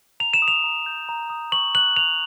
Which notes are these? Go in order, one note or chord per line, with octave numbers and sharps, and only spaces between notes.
A#5 F7
E7
D#6
F7
A#5
G6
A#5
D#6
C#6 F#7
F#6 F#7
F#6 F7